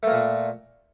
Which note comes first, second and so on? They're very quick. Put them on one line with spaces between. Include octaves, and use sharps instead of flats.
A3 A#3 A#2